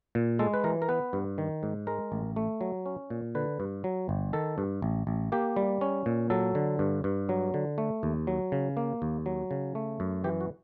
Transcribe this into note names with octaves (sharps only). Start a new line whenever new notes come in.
A#2
G#3 A4
B4
E3 A#4
A#4
B3 B4
G2
D#3
G#2
G#3 A#4
A1
A3
F#3
C#4
A#2
D3 B4
G2
F#3
G1
D#3 A4
G2
A1
A1
A#3 G4
G3
C#4
A#2
F#3 A4
D3
G2
G2
F#3
D3
A3
D#2
F#3
C#3
A#3
D#2
F#3
C#3
A3
F#2
E3 G4
F#4